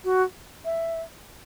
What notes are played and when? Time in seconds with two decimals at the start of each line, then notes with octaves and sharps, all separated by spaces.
0.04 F#4
0.65 E5